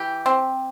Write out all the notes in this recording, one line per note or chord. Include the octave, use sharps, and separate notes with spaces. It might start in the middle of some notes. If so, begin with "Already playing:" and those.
Already playing: E3 G4
C4